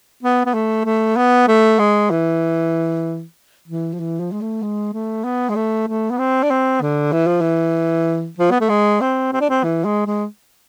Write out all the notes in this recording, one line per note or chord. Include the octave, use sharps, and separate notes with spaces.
B3
B3
A3
A3
B3
A3
G#3
E3
E3
F3
E3
F3
G#3
A3
G#3
A3
B3
G#3
A3
A3
B3
C4
D4
C4
D3
E3
F3
E3
F3
B3
A3
G#3
C4
C4
D4
C4
E3
G#3
G#3